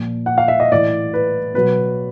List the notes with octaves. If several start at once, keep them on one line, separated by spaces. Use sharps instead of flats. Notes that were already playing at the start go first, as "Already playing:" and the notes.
Already playing: A#2 F3
F#5
F5
E5
D#5
A2 E3 D5
B4
B2 F#3 B4